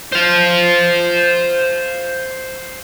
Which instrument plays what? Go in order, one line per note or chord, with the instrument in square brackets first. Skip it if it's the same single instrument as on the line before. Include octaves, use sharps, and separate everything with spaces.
[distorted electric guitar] C5 F5